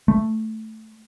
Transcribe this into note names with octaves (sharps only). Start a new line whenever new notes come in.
A3